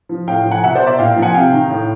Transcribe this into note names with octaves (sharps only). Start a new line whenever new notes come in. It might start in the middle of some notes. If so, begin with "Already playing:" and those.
F3
A2 F5 G5
F3
F#5 G#5
B2 E5 F#5
C5 D5
D5 E5
A#2 F5 G5
F3
F#5 G#5
C3 F5 G5
D#3
A2